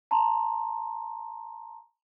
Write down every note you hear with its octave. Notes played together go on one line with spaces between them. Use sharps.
A5 A#5 C6